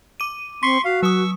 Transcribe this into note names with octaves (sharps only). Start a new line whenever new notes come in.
D6 D#7
C4 C6 C#6 B6
F#4 F5
F#3 C#6 D#6 E6